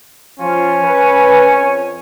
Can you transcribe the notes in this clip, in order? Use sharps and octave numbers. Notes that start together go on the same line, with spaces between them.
F3 C#4 F4
B4
F2 C#5